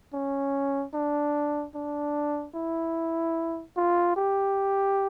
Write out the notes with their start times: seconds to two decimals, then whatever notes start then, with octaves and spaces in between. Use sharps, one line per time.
0.13 C#4
0.94 D4
1.75 D4
2.55 E4
3.76 F4
4.16 G4